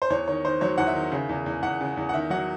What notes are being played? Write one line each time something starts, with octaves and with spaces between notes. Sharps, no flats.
C5
E2 C#5
D#3 C#5
D#3 C5
F#3 C#5
E2 F#5
E5
D#3
C#3
E2
E2
E2 F#5
C#3
E2
F#5
D#3 E5
F#3 F#5